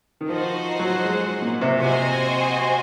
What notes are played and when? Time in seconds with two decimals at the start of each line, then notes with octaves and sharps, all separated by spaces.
0.21 D#3
0.29 F3 D#4 F#4 C5 F#5
0.79 F#3
1.04 G#3
1.42 A#2
1.61 C3
1.80 C3 C4 F#4 C5 D#5 G#5